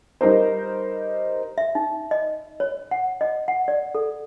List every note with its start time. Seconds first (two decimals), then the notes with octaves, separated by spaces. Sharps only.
0.21 G3 D#4 A#4 C5
1.58 E5
1.75 D#4
2.11 D#5
2.60 C#5
2.91 F#5
3.21 D#5
3.48 F#5
3.68 D5
3.95 A4